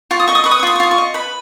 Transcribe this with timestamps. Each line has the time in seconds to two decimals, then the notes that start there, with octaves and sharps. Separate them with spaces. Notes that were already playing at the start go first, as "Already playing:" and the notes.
0.11 F4 C#6
0.20 D#6
0.28 D#5 C#6
0.35 D#6
0.44 B4 C#6
0.51 D#6
0.59 C#6
0.63 F4 D#6
0.76 C#6
0.80 F4 D#6
0.91 C#6
0.98 D#5
1.14 B4 B5